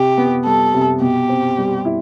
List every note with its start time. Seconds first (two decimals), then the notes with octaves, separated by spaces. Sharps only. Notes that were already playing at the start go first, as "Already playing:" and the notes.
Already playing: C3 G4
0.18 B3
0.45 G3 A4
0.74 C3
1.01 B2 G4
1.29 C4
1.58 G3
1.85 E4